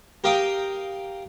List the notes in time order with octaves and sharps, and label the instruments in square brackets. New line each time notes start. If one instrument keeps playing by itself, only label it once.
[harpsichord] G4 A#4 F5 G5 D#6